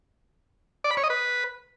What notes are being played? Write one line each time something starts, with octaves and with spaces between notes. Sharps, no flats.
D5
B5
C#5
D#5
B4